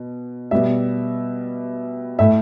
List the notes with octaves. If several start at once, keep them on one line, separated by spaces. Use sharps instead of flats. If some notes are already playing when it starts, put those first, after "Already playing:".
Already playing: B2
B2 G3 E5
A2 A3 E5